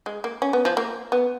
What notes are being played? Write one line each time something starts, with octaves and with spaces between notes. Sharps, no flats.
G#3
A#3
C#4
B3
F3
A#3
B3